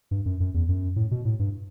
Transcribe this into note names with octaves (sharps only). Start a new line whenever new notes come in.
G2
F#2
F#2
E2
F#2
A2
B2
A2
G2